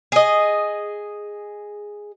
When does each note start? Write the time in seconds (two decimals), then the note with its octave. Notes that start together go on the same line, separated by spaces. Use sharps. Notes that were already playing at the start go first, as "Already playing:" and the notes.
0.12 G#4 D#5